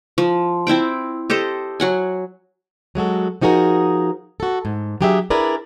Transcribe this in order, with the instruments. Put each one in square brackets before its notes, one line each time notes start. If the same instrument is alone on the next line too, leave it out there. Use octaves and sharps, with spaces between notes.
[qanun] F3
C4 E4 C5 G5
G4 A4 C5 D#5
F#3 F#5 G#5
[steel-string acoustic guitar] F#3 G#3 F#4 A4
F3 D#4 F#4 G#4 A#4
F#4 A4
G#2
F#3 D4 G4 G#4 D5 E5
D4 E4 G#4 A#4 B4 D5